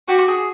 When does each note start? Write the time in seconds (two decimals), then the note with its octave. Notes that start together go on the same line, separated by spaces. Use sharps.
0.08 F#4 G4
0.28 G#4